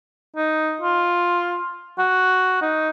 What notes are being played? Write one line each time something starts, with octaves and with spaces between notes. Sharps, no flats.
D#4
F4
F#4
D#4